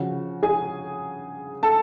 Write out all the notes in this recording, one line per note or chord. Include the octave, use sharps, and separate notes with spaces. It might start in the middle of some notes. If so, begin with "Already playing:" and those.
Already playing: C#3 F3 F#4
G#4 G#5
A4 A5